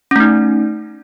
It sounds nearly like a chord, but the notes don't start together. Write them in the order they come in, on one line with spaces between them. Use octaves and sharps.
C#4 A3 D#4